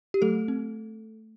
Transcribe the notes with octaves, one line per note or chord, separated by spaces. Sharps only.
G4
F#3 A3 A4
C4